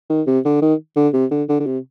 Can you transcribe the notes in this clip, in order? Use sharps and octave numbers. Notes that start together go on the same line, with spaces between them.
D#3
C3
D3
D#3
D3
C3
D3
D3
D3
C3